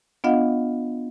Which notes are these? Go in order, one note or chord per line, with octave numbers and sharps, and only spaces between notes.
B3 D4 F4 D#5 F5 F#5